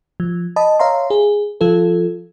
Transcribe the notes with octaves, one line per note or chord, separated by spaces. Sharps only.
F3
D#5 A5 B5 D#6
C#5 E5 F5 A#5 C6
G#4
F3 F4 A4